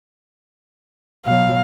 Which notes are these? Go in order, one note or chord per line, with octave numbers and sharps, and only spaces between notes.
B2 F#3 F5